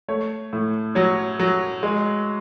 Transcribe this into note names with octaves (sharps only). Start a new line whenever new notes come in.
A3 C#5
A2
F#3 C#5
F#3
G#3